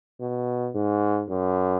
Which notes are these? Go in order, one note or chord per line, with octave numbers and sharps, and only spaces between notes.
B2
G#2
F#2